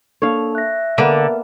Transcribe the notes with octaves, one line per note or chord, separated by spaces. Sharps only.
A#3 D4 A4 C#5 F5
E5 F#6 A#6
D3 A#3 B3 A#4